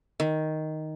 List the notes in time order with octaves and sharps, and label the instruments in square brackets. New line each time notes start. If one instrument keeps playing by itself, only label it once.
[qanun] D#3